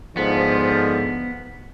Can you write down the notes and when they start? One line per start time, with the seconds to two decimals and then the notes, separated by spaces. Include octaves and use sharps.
0.17 G#2 D3 F3 B3